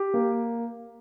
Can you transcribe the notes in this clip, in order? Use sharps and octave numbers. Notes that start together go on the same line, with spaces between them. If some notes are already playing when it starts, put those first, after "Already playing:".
Already playing: G4
A#3